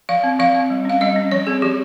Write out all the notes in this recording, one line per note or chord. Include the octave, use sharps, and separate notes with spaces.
F3 F5
C4
F3 F5
C4
G3
C#4 F5
G3 D#5
C#4
F3 C#5
C4 G#4
F3 G4